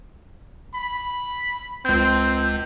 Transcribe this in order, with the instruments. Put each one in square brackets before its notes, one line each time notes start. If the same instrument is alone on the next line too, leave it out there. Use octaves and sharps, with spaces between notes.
[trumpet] B5
[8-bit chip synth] C#2 G6 [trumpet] C4